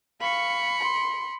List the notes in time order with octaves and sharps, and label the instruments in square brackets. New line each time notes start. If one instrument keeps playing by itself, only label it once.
[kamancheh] F5 C#6 [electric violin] B5 C#7
[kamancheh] C6